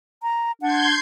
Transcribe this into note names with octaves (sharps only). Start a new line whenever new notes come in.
A#5
D4 F#5 C6 G6 G#6